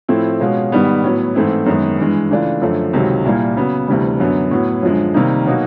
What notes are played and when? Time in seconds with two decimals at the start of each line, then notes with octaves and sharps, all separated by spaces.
0.09 A2 F3 A3 C4 E4
0.40 B2 G#3 C#4 F4
0.72 G#2 D#3 G3 B3
1.04 A2 F#3 B3
1.35 G#2 E3 A3 C4 E4
1.66 F#2 D#3 G#3 B3
1.98 G2 E3 G#3
2.30 C#3 E3 A3 D4 F4
2.62 F#2 D3 F3 A3
2.93 C#2 C3 D#3 F#3
3.25 C2 A#2 G3 A#3
3.57 C#3 F#3 B3
3.88 D2 C3 E3 G3
4.20 F#2 D3 F#3 B3
4.51 A2 F#3 B3
4.83 F#2 D3 F3 G#3
5.14 C3 D#3 G3 A#3 D#4
5.46 B2 F#3 A#3 D#4 F#4